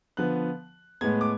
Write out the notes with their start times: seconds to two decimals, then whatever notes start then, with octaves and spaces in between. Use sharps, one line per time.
0.17 D3 F3 B3 F#6
1.01 A2 G#3 B3 G#6
1.21 D6